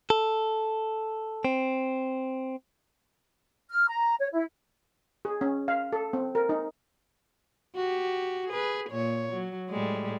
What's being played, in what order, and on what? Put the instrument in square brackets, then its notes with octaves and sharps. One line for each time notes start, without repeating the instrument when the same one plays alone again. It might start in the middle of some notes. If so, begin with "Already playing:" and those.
[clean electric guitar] A4
C4
[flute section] F6
A#5
C#5
E4
[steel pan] G#4
C#4
F5
A4
C4
A#4
D#4
[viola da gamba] F#4 G4
G#4 B4
A#2 C#5
F#3
A2 G3 G#3